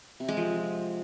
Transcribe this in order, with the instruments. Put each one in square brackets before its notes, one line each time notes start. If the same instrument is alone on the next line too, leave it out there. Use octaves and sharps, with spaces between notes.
[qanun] C3
G#3
F3